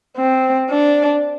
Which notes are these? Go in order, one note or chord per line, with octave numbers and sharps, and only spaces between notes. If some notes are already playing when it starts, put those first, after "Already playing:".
C4
D4